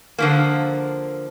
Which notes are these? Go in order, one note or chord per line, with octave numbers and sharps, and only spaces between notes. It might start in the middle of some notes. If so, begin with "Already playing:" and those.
D3 F3 A#3